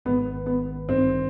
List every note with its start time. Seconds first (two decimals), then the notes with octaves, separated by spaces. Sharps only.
0.05 G#1 G#2 D#3 B3
0.46 B3
0.88 A1 G2 D#3 C4